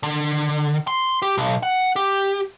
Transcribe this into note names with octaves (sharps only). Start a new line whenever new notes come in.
D3
C6
G4
B1
F#5
G4